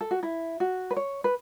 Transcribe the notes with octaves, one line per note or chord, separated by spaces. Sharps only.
A4
F#4
E4
F#4
B4
C#5
B4